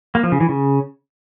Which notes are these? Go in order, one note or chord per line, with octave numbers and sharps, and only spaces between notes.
A#3
F3
C#3
E3
C#3